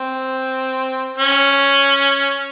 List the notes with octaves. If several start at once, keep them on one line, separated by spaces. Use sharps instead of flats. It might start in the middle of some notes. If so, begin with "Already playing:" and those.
Already playing: C4
C#4